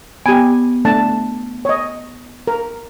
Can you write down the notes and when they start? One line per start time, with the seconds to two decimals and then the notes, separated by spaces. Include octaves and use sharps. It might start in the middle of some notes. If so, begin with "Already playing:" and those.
0.26 B3 G4 G#5
0.85 A3 D4 A5
1.65 C#5 D#5
2.48 A#4